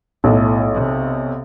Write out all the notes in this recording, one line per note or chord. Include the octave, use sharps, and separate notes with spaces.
B1 A2
C3